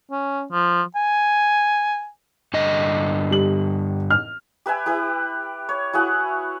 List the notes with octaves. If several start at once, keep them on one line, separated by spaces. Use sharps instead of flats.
C#4
F3
G#5
G2 D3 D#5
G3 F#7
F6
G4 B4 E5 G#5
E4 G4 B4
C#5
E4 F#4 G#4 F#5